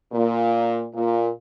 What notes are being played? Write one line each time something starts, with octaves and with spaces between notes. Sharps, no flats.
A#2
A#2